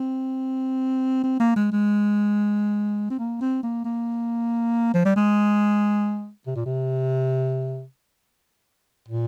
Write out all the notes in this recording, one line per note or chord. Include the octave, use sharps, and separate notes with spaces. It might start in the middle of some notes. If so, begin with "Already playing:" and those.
Already playing: C4
C4
A#3
G#3
G#3
C4
A#3
C4
A#3
A#3
F3
G3
G#3
C3
A#2
C3
A#2